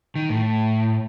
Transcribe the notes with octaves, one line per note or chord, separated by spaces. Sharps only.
D#3
A2